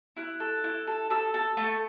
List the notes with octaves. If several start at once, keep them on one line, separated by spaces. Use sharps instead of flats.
E4 F#6
A4
E4
A4
A4 E6
A4
A3